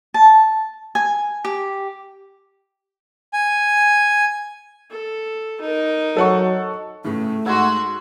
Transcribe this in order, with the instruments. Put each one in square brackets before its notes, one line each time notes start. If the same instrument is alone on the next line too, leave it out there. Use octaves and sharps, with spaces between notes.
[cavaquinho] A5
G#5
G4
[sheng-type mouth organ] G#5
[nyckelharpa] A4
D#4 A#4
[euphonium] F#3 [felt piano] A4 F#5 C#6
[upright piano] A2 C#3 E3 [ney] A3
[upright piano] G#2 E6 G#6 [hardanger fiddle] F#4 [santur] F#5 C6